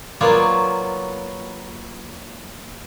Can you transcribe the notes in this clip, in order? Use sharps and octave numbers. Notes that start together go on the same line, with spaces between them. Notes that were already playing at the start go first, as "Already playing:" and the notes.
F#3 A#3 B3 F4 C#5 D5